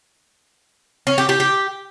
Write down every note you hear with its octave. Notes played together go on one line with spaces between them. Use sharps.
C#4
G4
G4
G4